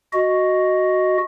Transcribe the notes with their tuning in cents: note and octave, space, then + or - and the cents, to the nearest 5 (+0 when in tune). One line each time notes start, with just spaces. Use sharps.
F#4 +0 D#5 +0